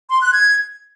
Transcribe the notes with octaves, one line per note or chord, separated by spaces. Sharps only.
C6
F#6
G#6